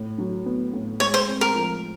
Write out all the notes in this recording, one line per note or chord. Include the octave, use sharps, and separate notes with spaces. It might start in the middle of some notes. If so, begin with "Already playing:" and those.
Already playing: A2
F#3
B3
A2
G#3 C#5
C5
C4
A#4
F3